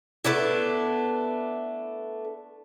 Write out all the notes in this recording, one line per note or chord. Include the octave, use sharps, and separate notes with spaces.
A3 B3 D4 E4